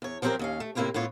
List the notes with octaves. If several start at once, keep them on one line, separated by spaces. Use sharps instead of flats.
E2 C#5
F3 F#3 C4 D#4 G4 A#4
D#2 C#4 F5
A3
A2 C3 A#3 E4 F4 G4
A2 B3 F4 C#5